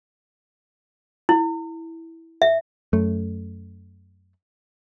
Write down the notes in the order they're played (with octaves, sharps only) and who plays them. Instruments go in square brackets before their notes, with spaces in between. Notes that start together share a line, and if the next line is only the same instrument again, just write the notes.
[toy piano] E4
E5
[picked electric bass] F#2 A3